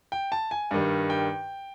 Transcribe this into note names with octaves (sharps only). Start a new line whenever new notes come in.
G5
A5
G#5
G2 D#3 G3
G5